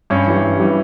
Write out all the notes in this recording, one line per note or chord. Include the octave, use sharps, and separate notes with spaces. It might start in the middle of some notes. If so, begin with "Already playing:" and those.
G2 C#4
E3 G3
G2
E3 G3